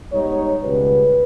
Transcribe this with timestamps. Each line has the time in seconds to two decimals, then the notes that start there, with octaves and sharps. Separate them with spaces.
0.12 G#2 G3 B3 D#4 C#5
0.62 C#2 B2 G3 B4